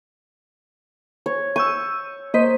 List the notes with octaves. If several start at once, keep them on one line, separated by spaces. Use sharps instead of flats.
C#5
C#6 E6 G6 D#7
A#3 C5 D#5 B6